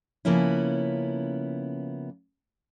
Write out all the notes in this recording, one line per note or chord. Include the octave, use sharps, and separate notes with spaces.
C#3 F3 A#3 B3 C#4 E4